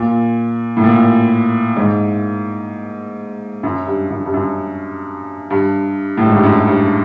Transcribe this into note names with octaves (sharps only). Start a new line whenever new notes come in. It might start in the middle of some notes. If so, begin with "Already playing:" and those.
Already playing: A#2
A2
A#2
G#2
F#2
G2
F#2
G2
F#2
G2
A2
G#2
G2
F#2
G2